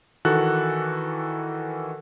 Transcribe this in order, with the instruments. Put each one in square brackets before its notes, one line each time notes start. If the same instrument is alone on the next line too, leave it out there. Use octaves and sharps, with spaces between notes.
[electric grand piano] D#3 E3 F#4 A4 F#6